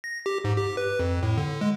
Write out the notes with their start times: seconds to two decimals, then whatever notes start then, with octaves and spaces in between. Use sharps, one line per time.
0.04 A#6
0.26 G4
0.44 G#2
0.57 G4
0.77 B4
1.00 F2
1.23 A2
1.37 D3
1.61 G#3